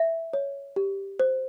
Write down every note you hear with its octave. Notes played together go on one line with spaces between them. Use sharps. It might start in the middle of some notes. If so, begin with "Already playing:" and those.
Already playing: E5
C#5
G4
C5